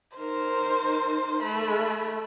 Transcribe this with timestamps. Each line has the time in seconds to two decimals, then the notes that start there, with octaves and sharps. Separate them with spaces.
0.17 D#4 A#4 C5
1.43 A3 B5